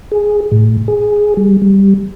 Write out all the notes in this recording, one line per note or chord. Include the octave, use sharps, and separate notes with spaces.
G#4
A2
G#4
G3
G3